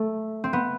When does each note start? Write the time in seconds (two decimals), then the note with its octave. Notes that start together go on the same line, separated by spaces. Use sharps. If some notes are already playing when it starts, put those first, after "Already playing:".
Already playing: A3
0.44 C4
0.53 B3